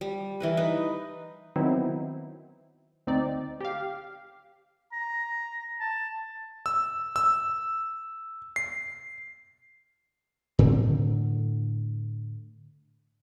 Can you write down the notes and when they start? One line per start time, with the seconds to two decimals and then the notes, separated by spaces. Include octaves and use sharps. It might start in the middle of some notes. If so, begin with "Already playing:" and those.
0.01 G3
0.40 E3 A#4 B4
0.57 D#4 B4
1.56 D#3 F#3 B3 C4 D#4 E4
3.07 D2 C4 D#4 D5
3.61 G4 F5
4.93 A#5
5.80 A5
6.66 E6
7.16 E6
8.56 C7
10.59 A2 D3 C4